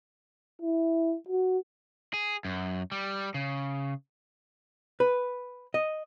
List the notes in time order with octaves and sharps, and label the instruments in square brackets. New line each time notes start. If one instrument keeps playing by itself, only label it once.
[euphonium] E4
F#4
[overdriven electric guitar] G#4
F#2
G3
C#3
[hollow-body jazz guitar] B4
D#5